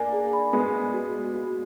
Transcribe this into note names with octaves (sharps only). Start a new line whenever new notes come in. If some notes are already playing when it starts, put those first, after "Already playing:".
Already playing: A#3 D4 G#5
G#4
B5
G#3 B3 G#4
G#4
F#4
F#4
F#4